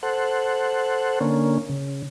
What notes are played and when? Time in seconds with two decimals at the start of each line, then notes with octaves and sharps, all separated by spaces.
0.03 A4 C5 F#5
1.21 D3 A#3 C#4
1.69 C#3